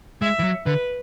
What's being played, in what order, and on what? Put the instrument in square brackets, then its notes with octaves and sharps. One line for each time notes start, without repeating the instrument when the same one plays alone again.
[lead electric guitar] G#3 [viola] E5
[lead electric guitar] E3
F#3
[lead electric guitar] D3 [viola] B4